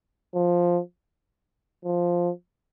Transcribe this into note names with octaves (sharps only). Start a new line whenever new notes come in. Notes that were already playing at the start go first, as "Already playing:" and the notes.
F3
F3